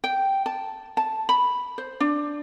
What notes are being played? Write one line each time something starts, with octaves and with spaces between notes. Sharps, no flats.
G5
A5
A5
B5
C5
D4